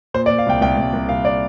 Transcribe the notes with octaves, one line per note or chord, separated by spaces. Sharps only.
A#2 C5
D5
A#2
F5
C2 G5
C2 G5
C2
C2
C2 F5
D5